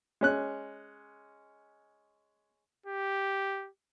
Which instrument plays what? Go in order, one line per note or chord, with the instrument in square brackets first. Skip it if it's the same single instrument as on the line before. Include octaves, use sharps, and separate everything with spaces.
[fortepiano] G#3 C#4 F#6
[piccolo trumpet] G4